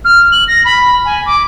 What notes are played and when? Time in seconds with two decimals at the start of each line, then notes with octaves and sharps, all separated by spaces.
0.05 F6
0.32 F#7
0.48 A#6
0.65 B5
1.05 G#5
1.26 D6